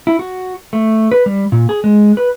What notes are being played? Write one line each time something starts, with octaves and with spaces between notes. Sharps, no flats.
E4
F#4
A3
B4
G3
A#2
G#4
G#3
B4